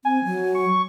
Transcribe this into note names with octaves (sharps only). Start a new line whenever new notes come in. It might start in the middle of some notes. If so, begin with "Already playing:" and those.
C4 G#5
F#3
C#6